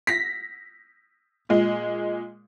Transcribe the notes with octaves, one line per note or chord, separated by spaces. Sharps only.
A#6 B6
A#2 G#3